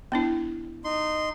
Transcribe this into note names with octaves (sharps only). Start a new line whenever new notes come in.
B3 D4 E4
D#4 C6